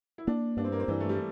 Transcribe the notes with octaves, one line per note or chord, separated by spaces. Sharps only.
E4
A#3 D4
G2 D4
C4
A#3
C4
G2 E3
A3
G3